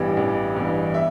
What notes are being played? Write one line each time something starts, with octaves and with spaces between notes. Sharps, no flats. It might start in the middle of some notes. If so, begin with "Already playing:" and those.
Already playing: A1 G2 E3 G3 B3 D5 G5
A1
G2 E3 G3 B3
E5